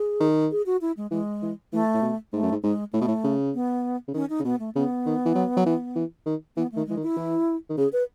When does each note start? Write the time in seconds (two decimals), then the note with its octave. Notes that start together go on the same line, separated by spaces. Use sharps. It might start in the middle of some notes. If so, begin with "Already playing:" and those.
Already playing: G#4
0.20 D#3
0.51 G#4
0.66 F#4
0.81 E4
0.97 G#3
1.11 E3 G#3
1.42 E3
1.73 E3 A3
1.94 A2
2.02 B2
2.33 G#2 A3
2.43 F#2
2.52 G#2
2.63 G#2 G#3
2.93 A2 A3
3.01 B2
3.08 A2
3.24 C#3
3.54 B3
4.08 C#3
4.14 D#3 C#4
4.30 D#4
4.40 C#3
4.45 B2 B3
4.59 A3
4.75 C#3 B3
5.06 D#3
5.25 E3
5.35 F#3
5.57 F#3
5.66 E3
5.96 E3
6.26 D#3
6.56 E3 B3
6.72 A3
6.77 D#3
6.87 E3 G#3
6.97 D#3
7.03 E4
7.17 E3
7.69 D#3
7.77 C#3 G#4
7.93 B4